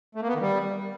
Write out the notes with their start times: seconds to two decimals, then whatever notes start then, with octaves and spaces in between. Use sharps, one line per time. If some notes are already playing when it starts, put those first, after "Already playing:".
0.15 A3
0.21 A#3
0.28 B3
0.34 D#3
0.41 G3